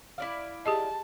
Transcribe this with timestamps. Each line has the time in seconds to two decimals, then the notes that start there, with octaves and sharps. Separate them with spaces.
0.18 E4 D5 F5
0.66 G4 G#4 D#5 A5